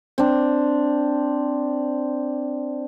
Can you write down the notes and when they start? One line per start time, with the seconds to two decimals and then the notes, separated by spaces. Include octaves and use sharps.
0.18 C4 D4